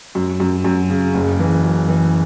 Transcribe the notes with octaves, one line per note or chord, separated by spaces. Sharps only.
F#2
F#2
F#2
C#3
F#1
E3
F#2
E3